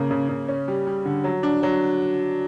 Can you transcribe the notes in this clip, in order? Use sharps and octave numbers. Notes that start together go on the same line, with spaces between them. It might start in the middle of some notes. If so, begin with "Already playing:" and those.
Already playing: C#3 A#3
C#3
C#3
C#4
G3
G3
D3
F#3
D4
F#3